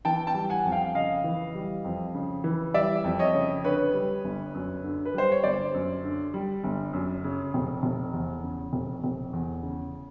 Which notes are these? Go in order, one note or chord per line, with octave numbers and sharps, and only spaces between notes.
E3 G5 A5
G5 A5
G3
F#5 G#5
F2
F5 G5
C#3 D#5 F5
E3
G3
F2
C#3
E3
G3 D5 E5
F2
C#5 D#5
C#3
D3 B4 C#5
G3
G1
F#2
D3
B4
G3 C5
C#5
G1 C5 D5
F#2
D3
G3
G1
F#2
C#3
F1
F1
E2
C#3
F1
F1
E2
C#3